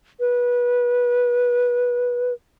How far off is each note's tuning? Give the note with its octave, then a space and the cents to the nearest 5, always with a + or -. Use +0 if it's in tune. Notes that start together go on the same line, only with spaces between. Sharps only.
B4 -20